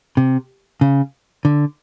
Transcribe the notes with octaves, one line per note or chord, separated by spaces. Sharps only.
C3
C#3
D3